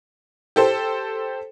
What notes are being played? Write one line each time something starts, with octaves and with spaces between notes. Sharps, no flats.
G4 A4 C5